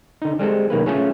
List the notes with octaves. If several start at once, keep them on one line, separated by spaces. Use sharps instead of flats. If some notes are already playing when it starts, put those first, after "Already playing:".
D3 D#4
G3 G#3 C4 A4
B1 D#3 A#3 B4
A3 C#4 F4 G#4 A4 C#5